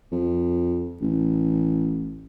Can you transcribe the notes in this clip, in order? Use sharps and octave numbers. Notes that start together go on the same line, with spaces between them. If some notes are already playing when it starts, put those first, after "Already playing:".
F2
A1